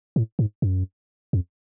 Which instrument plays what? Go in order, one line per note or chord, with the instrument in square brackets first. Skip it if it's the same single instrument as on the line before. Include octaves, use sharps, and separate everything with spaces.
[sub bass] A2
G#2
F#2
F2